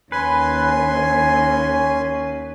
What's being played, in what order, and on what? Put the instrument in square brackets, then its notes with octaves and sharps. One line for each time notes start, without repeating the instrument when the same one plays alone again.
[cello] D#2 [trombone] C#4 [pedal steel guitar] B4 [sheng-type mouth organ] G#5 C6